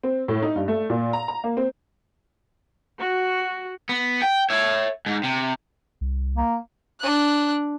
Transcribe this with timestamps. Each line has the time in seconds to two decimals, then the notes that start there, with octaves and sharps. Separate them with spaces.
0.03 C4
0.28 A2
0.43 D#4
0.56 G2
0.68 A3
0.90 A#2
1.13 A#5
1.28 A#5
1.44 A#3
1.57 C4
2.98 F#4
3.89 B3
4.22 G5
4.50 C#5 E5
5.06 G#2
5.24 C3
6.01 C2
6.37 A#3
7.00 D4 F#6